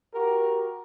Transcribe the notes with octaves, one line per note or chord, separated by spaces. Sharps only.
F#4 G4 A#4